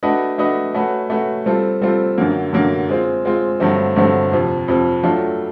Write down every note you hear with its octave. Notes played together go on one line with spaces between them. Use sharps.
A3 D4 F#4 B4 D#5
A3 D4 F#4 B4 D#5
A3 C#4 F#4 B4
A3 C#4 F#4 B4
G3 C4 F4 A4
G3 C4 F4 A4
F#2 D3 F#3 A#3
F#2 D3 F#3 A#3
G#3 C4 F4
G#3 C4 F4
G2 D3 F#3 A3 C4
G2 D3 F#3 A3 C4
F2 C3 F3
F2 C3 F3
F#3 A3 D4 F4 A4